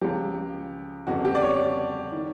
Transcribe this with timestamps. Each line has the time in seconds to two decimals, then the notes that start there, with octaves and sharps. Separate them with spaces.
0.01 C#2 C#3 F3 G4
1.07 G1 F2 C#3 F#4
1.25 G4
1.35 D5
1.42 C#5
2.12 D#3